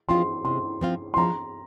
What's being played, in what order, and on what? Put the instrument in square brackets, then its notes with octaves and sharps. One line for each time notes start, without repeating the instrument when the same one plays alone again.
[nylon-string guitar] F3 C4 F4 [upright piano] C6
[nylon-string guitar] C3 [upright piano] C6
[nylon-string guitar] F3 C4 F4
[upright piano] C6
[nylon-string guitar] F3 [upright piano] A#5